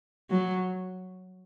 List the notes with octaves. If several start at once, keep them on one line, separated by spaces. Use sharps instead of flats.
F#3